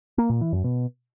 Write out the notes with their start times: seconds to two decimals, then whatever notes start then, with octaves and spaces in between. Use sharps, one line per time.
0.18 A#3
0.30 A#2
0.41 E3
0.53 F#2
0.64 B2